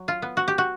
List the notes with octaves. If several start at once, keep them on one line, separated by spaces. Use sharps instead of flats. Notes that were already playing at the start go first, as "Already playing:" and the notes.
Already playing: F#3
F4
B3
F#4
G4
F#4